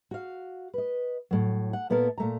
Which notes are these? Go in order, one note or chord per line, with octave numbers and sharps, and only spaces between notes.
F#4 F5
B4 D#5
A2 F#3
F#5
A#2 B3 E4 A4 A#4
A#2 A3 A#5